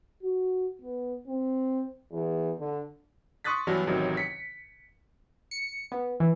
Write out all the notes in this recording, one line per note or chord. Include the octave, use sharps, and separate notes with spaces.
F#4
B3
C4
E2
D3
C6 C#6 D#6 F#6 A6 B6
G2 E3 F#3 B3 D4
A1 C3 D#3 F#3
B6 C#7
C#7
B3
E3